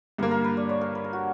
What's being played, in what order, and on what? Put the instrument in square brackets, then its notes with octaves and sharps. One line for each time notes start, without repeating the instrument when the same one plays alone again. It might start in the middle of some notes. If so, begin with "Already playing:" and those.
[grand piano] G2 D3 A#3 [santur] A#4
[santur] A#4
B4
D5
C#5
A#4
B4
A#4
F#4